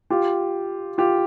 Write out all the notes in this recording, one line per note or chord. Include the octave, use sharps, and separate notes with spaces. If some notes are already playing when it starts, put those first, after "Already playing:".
F4 G4
F4 G4